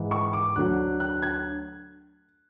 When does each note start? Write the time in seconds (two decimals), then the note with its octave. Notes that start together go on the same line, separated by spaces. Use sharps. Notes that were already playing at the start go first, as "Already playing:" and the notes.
Already playing: G#2 E3
0.11 C#6
0.33 D6
0.56 D2 D3 F#3 F#6
1.00 F#6
1.22 G#6